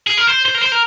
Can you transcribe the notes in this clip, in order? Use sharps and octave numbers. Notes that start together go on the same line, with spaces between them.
G#4
A#4
C5
C5
A#4
C5
A#4